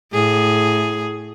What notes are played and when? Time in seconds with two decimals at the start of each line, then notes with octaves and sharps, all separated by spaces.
0.13 A2 G#4